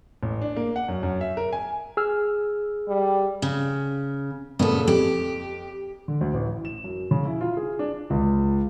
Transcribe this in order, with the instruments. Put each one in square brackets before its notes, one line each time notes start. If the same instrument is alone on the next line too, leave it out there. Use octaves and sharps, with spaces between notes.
[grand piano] A1
D4
A#3
F#5
F#2
F#2
E5
A#4
G#5
[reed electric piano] G#4 E6 F6
[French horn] G3
[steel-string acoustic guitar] C#3
[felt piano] F#2 A#2 C#3 [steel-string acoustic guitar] B3 A4
[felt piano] F2 [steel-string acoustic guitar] G4
[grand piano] D3
D2
A1
E3
E7
F#2
C#3
E4
F4
G#4
D4
C#2